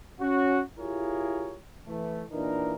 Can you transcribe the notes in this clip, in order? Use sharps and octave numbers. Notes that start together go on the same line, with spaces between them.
C#4 F#4
E4 F4 G4 G#4 A#4 C#5
E3 A3
A#2 E3 D4 D#4 A#4